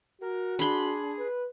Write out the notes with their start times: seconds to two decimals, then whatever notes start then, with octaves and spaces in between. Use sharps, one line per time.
0.21 F#4 A#4
0.59 D4 G#4 B5 C6
1.18 B4